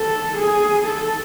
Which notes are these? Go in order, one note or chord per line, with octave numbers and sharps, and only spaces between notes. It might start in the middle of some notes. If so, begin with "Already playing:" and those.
Already playing: A4
G#4
A4